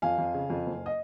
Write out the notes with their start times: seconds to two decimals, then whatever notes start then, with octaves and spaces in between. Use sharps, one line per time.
0.02 F2 F5 G#5
0.18 F2
0.34 C#3
0.50 F2
0.66 F#1
0.86 D#5